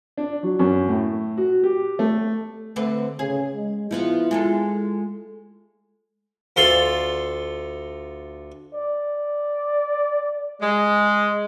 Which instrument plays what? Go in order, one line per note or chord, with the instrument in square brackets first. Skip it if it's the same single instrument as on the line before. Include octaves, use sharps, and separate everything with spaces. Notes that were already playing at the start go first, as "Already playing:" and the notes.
[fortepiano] D4
F#3
F#2
A2
F#4
G4
A3
[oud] D3 C4 B4 [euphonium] A3
[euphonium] C#3 [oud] G#4
[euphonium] G#3
[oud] F3 B3 F4 [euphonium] E4
[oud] G#3 F4 A4
[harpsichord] D2 F4 A4 C6
[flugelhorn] D5
[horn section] G#3